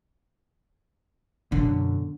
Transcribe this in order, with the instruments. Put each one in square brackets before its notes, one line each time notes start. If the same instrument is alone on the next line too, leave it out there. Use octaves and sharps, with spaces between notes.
[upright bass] F#2 B2 [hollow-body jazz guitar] D3